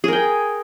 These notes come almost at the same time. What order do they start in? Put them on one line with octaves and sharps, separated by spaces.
G#4 A#4 G5